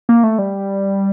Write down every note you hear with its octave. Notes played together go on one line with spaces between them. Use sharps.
A#3
A3
G3